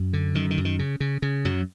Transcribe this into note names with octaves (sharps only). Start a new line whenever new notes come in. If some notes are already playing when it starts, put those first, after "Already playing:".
Already playing: F#2
D3
F#2 D#3
D#3
F#2
D#3
C#3
C#3
C#3
F#2 F#3